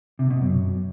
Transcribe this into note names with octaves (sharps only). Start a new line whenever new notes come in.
C3
B2
F#2